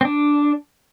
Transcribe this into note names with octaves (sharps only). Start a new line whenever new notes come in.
C4
D4